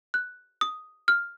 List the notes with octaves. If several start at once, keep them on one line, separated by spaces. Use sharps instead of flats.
F#6
D#6
F6